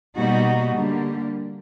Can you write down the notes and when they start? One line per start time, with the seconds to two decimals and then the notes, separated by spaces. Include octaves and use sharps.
0.16 B2 G3 A#3 D#4 F#4
0.75 D3 G3 A#3